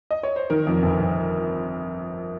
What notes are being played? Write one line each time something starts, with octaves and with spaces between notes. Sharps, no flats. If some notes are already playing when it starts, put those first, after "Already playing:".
D#5
C#5
C5
D#3 A#4
F2
G1
G1